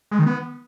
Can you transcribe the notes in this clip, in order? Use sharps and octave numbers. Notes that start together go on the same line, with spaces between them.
G#3
D#3
B3